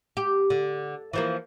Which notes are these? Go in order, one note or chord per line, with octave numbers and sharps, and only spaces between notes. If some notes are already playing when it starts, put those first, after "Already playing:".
G4
D3
E3 F3 A#3